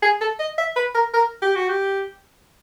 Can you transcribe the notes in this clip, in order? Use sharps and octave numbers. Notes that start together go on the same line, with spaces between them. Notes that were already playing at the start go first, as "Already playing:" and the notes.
G#4
A4
D#5
E5
B4
A#4
A#4
G4
F#4
G4